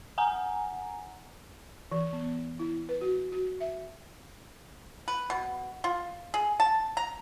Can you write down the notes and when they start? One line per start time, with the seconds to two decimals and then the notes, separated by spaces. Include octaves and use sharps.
0.18 F#5 G#5 A#5
1.92 E3
2.13 B3
2.59 E4
2.89 B4
3.01 F#4
3.32 F#4
3.60 E5
5.08 B4
5.30 B2
5.84 F4
6.34 G#4
6.60 A5
6.97 A#5